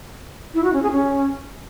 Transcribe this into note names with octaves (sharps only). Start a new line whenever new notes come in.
E4
F#4
C#4
G#4
C#4